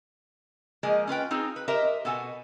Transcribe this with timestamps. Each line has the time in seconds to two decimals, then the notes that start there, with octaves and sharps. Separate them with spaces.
0.83 F3 G#3 A#3 G#4 D#5
1.07 C#4 F4 B4 G5
1.31 C4 D#4 F4 G#4
1.56 B4
1.68 G4 A#4 C5 D#5 E5
2.05 B2 A4 F#5 G#5